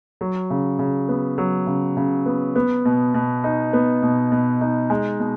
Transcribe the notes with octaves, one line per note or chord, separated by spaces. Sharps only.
F#3
C#3
C#3
B3
F#3
C#3
C#3
B3
B3
B2
B2
D#4
B3
B2
B2
D#4
G#3
B2